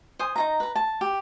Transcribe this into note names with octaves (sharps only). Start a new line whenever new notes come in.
C5 G#5 D#6
D#4 F4 A#5
B4 A#5
A5
G4